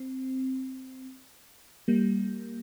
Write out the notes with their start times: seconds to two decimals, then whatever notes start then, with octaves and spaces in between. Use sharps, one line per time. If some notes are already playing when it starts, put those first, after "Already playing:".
Already playing: C4
1.88 G3 A#3